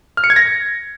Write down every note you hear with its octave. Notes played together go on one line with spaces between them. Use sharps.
F6
C#7
G#6
A#6